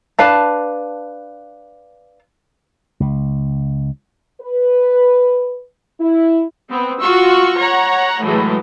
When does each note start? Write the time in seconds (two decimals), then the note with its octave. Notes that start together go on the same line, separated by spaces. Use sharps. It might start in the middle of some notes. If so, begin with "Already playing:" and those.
0.19 D4 B4 F5 A5
3.00 C#2
4.41 B4
6.01 E4
6.70 B3 C4
7.00 F4 F#4 C#6 E6
7.58 C#5 F#5 A#5
8.23 A2 E3 F#3 G#3